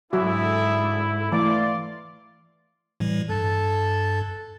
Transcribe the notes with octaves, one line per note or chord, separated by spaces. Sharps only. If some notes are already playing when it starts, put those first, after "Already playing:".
G#2 D3 F#3 E4 F#4 G#4 D5 E5
E3 A3 D5 F5 C6 D6
A2 E3 G3
G2 A4